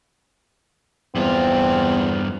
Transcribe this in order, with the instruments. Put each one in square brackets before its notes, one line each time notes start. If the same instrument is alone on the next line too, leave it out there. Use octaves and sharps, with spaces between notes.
[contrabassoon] E2 [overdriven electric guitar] G2 F4 [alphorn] C4